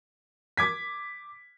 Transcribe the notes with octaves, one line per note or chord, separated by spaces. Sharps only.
D6 G#6 B6